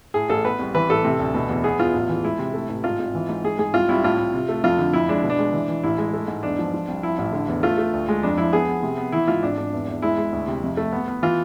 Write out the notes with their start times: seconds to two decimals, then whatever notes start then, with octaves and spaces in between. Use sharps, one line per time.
0.14 A2 G#4
0.29 A1 A4
0.45 B3 B4
0.59 C2
0.75 E3 B4
0.89 A1 A4
1.04 C3
1.19 D2
1.34 B2
1.49 E2
1.64 B3 G#4
1.79 E2 F4
1.94 A1
2.09 E3
2.24 G#3 E4
2.39 C3
2.54 A3
2.69 A1
2.84 G#1 F4
2.99 G#1
3.15 E3
3.29 G#2
3.44 G#2 G#4
3.59 G#2 G#4
3.74 C2 F4
3.89 C2 E4
4.04 A2 F4
4.19 A2
4.34 C3
4.49 A3
4.64 F2 F4
4.78 D3
4.93 F2 E4
5.09 G#3 D4
5.23 B2
5.30 D4
5.39 G#3
5.53 E3
5.68 E3
5.84 A1 E4
5.98 G#3
6.13 A3
6.28 G#2
6.43 E2 D4
6.58 F3
6.74 F3
6.88 C2
7.03 F3 E4
7.18 A1
7.33 D3
7.48 E2
7.63 A3 F4
7.78 A3
7.93 D2
8.08 G#3
8.23 F2 D4
8.37 F3 E4
8.53 B3 G#4
8.68 B3
8.83 C3
8.98 B3
9.12 E3 E4
9.28 G#2 F4
9.43 G#1 D4
9.57 G#1 D4
9.73 E2
9.88 E2
10.02 G#3 E4
10.18 G#3
10.32 D2
10.48 C3
10.62 F2
10.77 A3
10.93 B3
11.08 B3
11.22 E3 F4